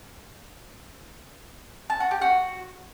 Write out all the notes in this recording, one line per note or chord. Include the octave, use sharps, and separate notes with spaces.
A5
F#4
G4
F#4